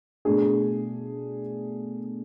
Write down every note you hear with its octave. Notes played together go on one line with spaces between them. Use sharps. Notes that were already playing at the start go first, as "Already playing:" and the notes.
B2 A3 D4 G#4